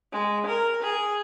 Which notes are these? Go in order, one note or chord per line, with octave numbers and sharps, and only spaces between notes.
G#3
A#4
G#4